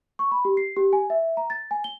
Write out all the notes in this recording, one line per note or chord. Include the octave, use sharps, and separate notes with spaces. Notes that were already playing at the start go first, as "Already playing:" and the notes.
C#6
B5
G4
C7
G4
G#5
E5
A#5
A6
G#5
G7